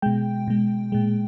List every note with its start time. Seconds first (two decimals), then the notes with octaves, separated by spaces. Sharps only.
0.02 B2 G#3 G5
0.48 B2 G#3
0.92 A#2 G#3